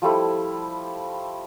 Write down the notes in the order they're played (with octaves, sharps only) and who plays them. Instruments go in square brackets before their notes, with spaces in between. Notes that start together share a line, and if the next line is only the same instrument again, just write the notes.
[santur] F3 G3 A3 E4